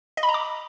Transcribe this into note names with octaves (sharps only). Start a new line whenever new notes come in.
D#5
B5
A#5
D6